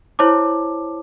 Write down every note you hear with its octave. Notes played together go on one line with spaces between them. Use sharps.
E4 C5 C#5 A5 D6